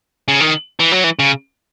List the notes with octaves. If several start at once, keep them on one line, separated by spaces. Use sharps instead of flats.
C#3
D#3
E3
F#3
E3
C#3